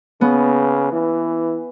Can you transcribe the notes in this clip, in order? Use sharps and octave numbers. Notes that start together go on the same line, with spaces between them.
C#3 B3
E3